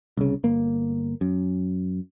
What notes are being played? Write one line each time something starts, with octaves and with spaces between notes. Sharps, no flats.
C2 C#3
G1 A#3
F#2